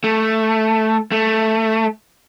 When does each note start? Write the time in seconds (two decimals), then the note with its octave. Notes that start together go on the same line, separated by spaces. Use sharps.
0.04 A3
1.12 A3